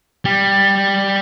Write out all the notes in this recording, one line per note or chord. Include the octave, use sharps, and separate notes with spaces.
G3